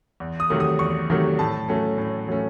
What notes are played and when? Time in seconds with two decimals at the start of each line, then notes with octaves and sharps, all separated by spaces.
0.20 E2
0.40 D#6
0.50 C3 D#3 F#3 A3
0.60 D#6
0.79 E2 C#6
1.10 C3 D#3 F#3 A3
1.39 A2 A5
1.68 F#3 A3 C#4
1.98 A2
2.28 F#3 A3 C#4